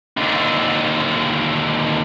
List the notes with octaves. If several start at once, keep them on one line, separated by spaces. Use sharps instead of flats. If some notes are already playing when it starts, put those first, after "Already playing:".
D#2 D3